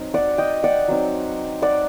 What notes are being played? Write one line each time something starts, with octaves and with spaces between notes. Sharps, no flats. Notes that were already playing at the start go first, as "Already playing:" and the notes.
Already playing: F#3 C4 D#4
D5 F#5
D#5 G5
D5 F#5
F#3 C4 D#4
D5 F#5